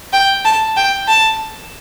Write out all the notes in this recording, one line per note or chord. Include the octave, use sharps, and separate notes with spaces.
G5
A5
G5
A5